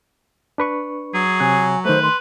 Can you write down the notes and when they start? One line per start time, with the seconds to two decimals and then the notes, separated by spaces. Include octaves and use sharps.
0.58 D4 B4 C#6
1.14 F#3 G#4
1.40 C3 C#5 G#5 F#6
1.85 D#3 A3 B4 C5
2.03 C6